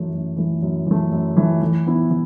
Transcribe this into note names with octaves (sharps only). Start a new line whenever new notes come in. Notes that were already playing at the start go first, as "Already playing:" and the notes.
Already playing: F#2 E3 A3
F#2
E3 A3
F#2
E3 A3
F#2
E3 A3
E3
B3 E4
E3